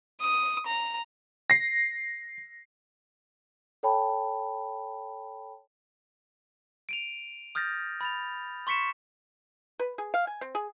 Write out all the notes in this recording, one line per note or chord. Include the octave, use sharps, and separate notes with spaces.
D#6
A#5
A#6 C7
A4 C#5 G5 A5 B5
D7 D#7 F7
D#6 F6 G6 A6 A#6
B5 A6 F7
C6 C#6 B6 C#7 E7
B4
G#4
F5
G#5
C4
G#4